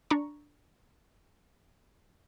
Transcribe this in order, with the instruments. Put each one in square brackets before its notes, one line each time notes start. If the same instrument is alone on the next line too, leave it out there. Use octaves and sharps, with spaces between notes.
[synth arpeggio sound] D4 A#5 C#6